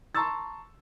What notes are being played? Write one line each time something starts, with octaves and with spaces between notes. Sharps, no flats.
A5 A#5 C6 C#6 E6 A6